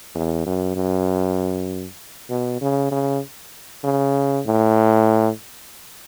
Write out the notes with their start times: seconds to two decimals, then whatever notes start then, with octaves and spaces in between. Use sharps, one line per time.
0.15 E2
0.46 F#2
0.76 F#2
2.30 B2
2.62 C#3
2.91 C#3
3.84 C#3
4.46 A2